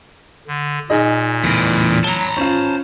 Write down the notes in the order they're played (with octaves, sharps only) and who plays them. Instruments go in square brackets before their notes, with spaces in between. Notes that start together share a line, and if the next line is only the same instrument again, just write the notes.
[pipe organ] D3
[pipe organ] A#2 [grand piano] D#4 G#4 D#5
[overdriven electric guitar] E2 A2
[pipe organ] F#3 [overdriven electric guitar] A5 A#5 [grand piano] G7
[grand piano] C#4 F4 [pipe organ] C5